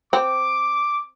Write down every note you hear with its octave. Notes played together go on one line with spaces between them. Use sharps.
C4 D6